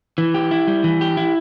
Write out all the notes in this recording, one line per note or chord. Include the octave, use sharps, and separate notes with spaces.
E3
G4
E4
G3
E3
G4
E4